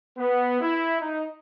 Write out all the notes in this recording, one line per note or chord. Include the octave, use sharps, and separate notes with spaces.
B3
E4
D#4